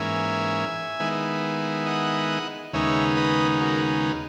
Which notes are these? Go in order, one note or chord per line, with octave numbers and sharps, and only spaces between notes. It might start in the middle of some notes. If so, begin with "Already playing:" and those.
Already playing: G#2 E3 A#3 C#4 E5 G#5
D#3 G#3 B3 E4
D#5 F#5
D#2 C#3 G#3 B3 D#4 C#5 E5
B4 D#5
F#4 A#4